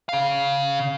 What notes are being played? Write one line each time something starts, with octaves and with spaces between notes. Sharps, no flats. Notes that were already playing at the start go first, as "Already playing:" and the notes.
C#3 F5